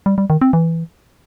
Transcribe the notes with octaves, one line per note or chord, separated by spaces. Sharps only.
G3
G3
D#3
C4
E3